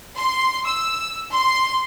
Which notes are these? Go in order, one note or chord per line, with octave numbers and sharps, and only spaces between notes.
C6
E6
C6